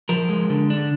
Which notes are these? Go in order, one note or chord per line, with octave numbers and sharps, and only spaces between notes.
F3 A#4
G#3
D3
D4